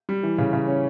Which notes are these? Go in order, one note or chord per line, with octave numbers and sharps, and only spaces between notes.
G3
E3
C#3
C#3
C#4